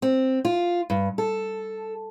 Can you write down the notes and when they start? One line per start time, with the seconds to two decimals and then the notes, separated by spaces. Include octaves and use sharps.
0.02 C4
0.45 F4
0.90 G2
1.18 A4